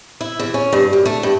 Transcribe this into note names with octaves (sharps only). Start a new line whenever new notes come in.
E4
E2
C#4
G2
F#2
A3
G2